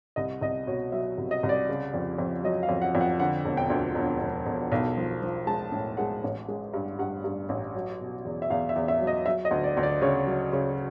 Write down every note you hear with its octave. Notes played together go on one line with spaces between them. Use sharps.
C2 D#5
C2 D#5
B2 C#5
F#3 E5
C2
D#5
C2
D5
C#3
F2
F2
F#3 D#5
F5
F2
F#5
F2
F#5
D3 F#5
E1
G5
D2
E1
E1
E1
B1
F3
F3
G#3 A5
A2
G#3 F#5
A1
G#3
G2
G2 F#5
G2
A1
F#3
B2
E2
E5
E2 F5
E5
E2
E5
F#3
D#5
F#3 E5
D#5
D2
D5
D2
D5
C#3 C#5
F#3
C#3